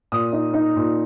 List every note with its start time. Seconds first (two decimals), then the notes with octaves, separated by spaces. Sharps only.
0.12 A#2 D#6
0.33 D#4
0.54 D#4
0.76 A#2